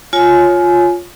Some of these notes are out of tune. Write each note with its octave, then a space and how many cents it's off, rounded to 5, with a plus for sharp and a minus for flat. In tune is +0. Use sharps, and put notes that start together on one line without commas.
F4 +10 C#5 +0 G#5 +25